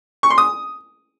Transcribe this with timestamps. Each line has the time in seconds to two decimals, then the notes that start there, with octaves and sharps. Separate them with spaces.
0.23 C#6
0.30 C6
0.38 D#6